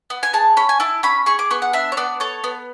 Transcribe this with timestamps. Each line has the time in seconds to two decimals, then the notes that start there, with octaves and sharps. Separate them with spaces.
0.10 B3
0.23 G#5
0.33 G#4 A5
0.57 C#4 B5
0.69 G#5
0.80 E4 A5
1.03 C#4 B5
1.26 G#4 C#6
1.39 D6
1.51 B3 C#6
1.62 F#5
1.73 D4 E5
1.92 C#5
1.97 B3 D5
2.20 A4 C#5
2.44 B3